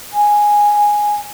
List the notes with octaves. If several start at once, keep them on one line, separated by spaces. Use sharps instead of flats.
G#5